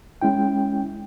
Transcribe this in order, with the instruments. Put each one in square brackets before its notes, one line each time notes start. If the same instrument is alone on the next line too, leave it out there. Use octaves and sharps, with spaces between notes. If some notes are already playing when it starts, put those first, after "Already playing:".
[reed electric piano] G#3 C#4 E4 G5